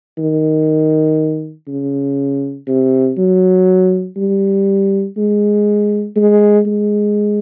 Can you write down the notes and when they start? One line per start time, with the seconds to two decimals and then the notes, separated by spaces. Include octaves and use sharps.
0.18 D#3
1.68 C#3
2.67 C3
3.18 F#3
4.16 G3
5.17 G#3
6.16 G#3
6.66 G#3